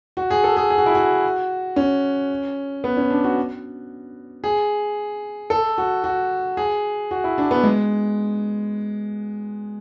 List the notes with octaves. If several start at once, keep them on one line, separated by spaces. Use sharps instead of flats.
F#4
G#4
A4
G#4
G#4
F#4
E4
F#4
C#4
B3
C#4
D4
F#4
G#4
A4
F#4
F#4
G#4
F#4
E4
D4
B3
G#3